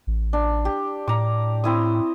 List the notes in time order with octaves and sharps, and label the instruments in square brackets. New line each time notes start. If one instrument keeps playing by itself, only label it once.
[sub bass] A1
[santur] D4
G4
[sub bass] A2 [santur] A#5 D6
[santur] C4 E4 D#6